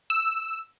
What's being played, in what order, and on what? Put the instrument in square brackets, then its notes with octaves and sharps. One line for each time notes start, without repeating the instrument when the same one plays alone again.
[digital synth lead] E6